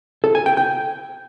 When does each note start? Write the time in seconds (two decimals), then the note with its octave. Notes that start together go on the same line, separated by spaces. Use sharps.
0.24 A4
0.35 G#5
0.46 G5
0.57 G5